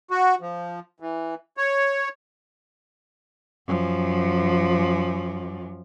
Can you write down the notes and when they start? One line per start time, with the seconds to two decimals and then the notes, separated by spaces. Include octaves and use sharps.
0.11 F#4
0.41 F3
1.00 E3
1.57 C#5
3.67 F#2 F3